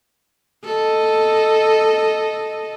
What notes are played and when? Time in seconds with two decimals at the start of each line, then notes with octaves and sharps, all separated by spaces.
0.65 A4 D#5